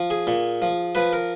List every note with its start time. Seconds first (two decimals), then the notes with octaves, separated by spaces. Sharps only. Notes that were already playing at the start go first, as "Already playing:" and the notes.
Already playing: F3
0.10 G#4
0.27 A#2
0.62 F3
0.95 F3 B4
1.13 A#4